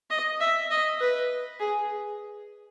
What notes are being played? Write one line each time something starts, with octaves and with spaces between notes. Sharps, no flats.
D#5
E5
D#5
B4
G#4